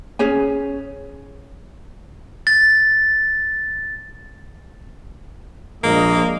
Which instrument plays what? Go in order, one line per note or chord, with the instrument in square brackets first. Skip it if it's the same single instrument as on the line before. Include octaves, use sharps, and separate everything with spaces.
[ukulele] C#4 G#4 C#5 G#5
[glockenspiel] A6
[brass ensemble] A#1 G#3 D#5 [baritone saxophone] A#3